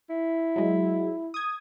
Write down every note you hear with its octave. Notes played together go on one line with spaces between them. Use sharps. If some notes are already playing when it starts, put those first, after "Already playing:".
E4
F#3 G#3
D#6 G#6